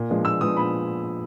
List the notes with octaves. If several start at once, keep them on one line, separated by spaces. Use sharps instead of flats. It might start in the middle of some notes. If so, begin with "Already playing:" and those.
Already playing: A#2
F3 G#3 B3 D4
A#2 E6
F3 G#3 B3 D4 D#6
A#2 B5